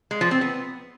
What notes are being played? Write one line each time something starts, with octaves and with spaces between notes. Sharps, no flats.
G#3
F3
C4
B3